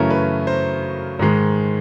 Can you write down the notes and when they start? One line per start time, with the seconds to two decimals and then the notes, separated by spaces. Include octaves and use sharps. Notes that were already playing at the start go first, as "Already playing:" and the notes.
Already playing: F#2 C#3 E3 A3 C#4 A#4
0.10 B4
0.47 C5
1.19 G#2 D#3 G#3